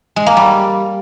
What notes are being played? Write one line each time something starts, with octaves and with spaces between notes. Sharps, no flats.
G#3
A#3
G3